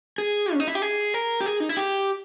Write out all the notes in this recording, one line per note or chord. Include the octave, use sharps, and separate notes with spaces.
G#4
C#4
D#4
E4
G4
G#4
A#4
G4
G#4
D#4
E4
G4